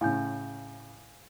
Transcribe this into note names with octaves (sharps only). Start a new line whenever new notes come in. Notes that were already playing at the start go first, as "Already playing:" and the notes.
A2 C#3 F5 G#5 G6